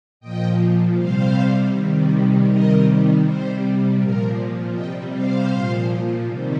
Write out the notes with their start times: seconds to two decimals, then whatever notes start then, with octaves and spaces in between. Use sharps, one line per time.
0.20 A#2 F3 D#5 G5
0.96 C3 G3 C5 F5
1.71 C3 D#3 G3
2.47 C3 D#3 G3 A#4 D#5
3.23 C3 G3 C5
3.98 A#2 F3 A#4
4.73 C3 G3 D#5 G5
5.11 C5 F5
5.50 A#2 F3
6.24 C3 D#3 G3